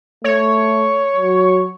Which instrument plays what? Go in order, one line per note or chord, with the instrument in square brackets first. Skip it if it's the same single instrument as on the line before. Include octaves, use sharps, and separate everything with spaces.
[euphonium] A3 [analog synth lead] C#5
[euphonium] F#3